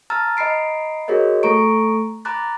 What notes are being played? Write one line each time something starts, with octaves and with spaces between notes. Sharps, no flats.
A5 A#5 E6 F6 A6
D#5 A#5 B5 C7 D7
F#4 G#4 A#4 C#5 D#5
A3 A4 A#5 C#6 D7
A#5 B5 D6 F#6 A6